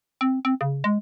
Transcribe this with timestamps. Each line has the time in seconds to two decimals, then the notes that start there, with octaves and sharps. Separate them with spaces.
0.21 C4
0.45 C4
0.61 C#3
0.84 G#3